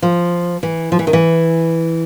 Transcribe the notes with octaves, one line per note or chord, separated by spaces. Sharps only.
F3
E3
F3
E3
D#3
E3